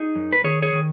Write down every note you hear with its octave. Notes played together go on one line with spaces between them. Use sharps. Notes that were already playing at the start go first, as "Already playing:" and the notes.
Already playing: D#4 G#4
F#2
B4
D#3 G#4 C#5
G#4 C#5
D#3